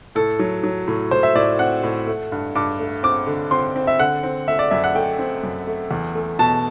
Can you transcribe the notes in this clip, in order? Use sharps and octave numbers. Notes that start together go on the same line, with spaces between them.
A2 A4
F#3
F#3
A2
A2 C5
E5
A2 D5
C4 F#5
A2
A3
G2
G2 D6
A3
C4 D6
D3
C4 C6
C4
E5
D3 F#5
C4
A3 E5
D5
F#2 E5
F#5
A3 G5
C4
F#2
A3
E2
A3
B2 A5